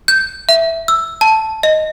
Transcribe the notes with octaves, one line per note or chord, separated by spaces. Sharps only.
G6
E5
E6
A5
D#5